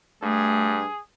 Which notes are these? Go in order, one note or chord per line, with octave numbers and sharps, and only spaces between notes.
G2 A3 G#4